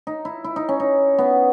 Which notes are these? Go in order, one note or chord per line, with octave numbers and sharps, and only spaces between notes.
D#4
E4
E4
D#4
C#4
D#4
B3